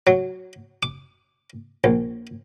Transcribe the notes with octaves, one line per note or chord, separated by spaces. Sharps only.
F#3
D6
A#1